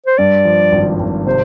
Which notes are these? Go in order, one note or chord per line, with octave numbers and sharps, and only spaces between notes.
C5
G2 D5
F3
G#1
G#1
C3 C5